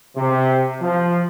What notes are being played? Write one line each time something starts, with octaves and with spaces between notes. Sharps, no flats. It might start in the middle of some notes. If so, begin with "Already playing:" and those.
C3
F3